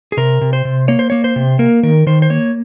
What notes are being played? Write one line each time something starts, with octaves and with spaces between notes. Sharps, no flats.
G#4
C3 A#4
C3
C5
C3
A#3 C#5
C5
A#3 C#5
C5
C3
A#3 A#4
D#3 A#4
D#3 C5
C5
A#3 C#5